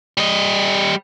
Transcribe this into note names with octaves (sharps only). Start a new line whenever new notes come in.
G3 D#5